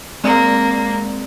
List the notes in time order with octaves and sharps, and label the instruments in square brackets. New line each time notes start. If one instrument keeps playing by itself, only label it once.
[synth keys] G#3 C4 D5 [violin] A#3